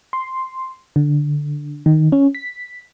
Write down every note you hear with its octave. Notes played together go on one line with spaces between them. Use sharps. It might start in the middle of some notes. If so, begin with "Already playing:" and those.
C6
D3
D#3
C#4
B6